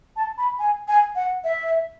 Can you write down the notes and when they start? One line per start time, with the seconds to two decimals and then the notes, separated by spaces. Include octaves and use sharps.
0.16 A5
0.38 B5
0.59 G#5
0.88 G#5
1.16 F#5
1.44 E5